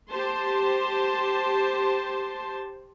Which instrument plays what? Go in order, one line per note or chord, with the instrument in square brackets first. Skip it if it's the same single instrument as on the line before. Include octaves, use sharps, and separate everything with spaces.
[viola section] G4 C5 A5 C6